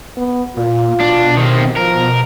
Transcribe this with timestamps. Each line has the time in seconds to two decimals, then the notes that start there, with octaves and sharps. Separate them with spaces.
0.17 B3
0.57 A#2 F4
1.00 B2 D4
1.37 C3 D#3 C4
1.77 F3 A#4